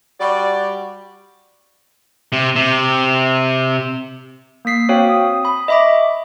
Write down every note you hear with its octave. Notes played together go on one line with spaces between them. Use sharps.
G3 F#4 D5
C3
C3
A#3 D#6 B6 C7
C4 F#4 C#5 F5 G5
D#6
B5 D#6
D#5 E5 B5 C#6 D6